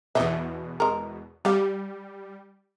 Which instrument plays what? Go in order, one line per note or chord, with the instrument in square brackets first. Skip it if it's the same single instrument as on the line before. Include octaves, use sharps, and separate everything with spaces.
[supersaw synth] E2 B2 [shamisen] D#5 E5
[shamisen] G#3 A#4
[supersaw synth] G3 [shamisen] G4 F5